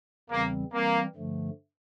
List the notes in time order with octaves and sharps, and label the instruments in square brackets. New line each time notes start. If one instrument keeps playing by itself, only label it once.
[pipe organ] E2 C#3 E3 G3 C4 [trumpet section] A#3
[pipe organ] E3 G3 C4 [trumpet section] A#3
[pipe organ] G2 D3 F3 A3